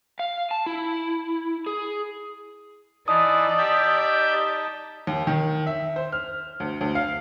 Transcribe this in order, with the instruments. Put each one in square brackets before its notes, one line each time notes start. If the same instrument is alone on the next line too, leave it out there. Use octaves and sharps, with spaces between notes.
[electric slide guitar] F5
A5
E4
G#4
[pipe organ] E3 [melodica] D#4 D#5 A5 [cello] D5 [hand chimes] D#6
[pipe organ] G4 E5 G6
[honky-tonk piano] D#2
D#3
E5
C5
F6
D2
D2
F5